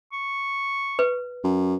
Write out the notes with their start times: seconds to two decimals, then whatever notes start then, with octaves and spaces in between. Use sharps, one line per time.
0.12 C#6
0.99 B4
1.44 F#2